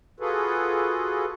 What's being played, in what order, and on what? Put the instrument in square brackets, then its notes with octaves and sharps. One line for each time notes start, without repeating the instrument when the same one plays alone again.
[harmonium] F4 F#4 G#4 A4 B4